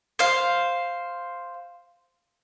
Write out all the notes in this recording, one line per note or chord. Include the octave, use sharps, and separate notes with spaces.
C5 F5